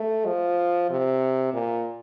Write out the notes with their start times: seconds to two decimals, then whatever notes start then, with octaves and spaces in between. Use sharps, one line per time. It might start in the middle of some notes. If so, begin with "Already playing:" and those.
Already playing: A3
0.26 F3
0.90 C3
1.53 A#2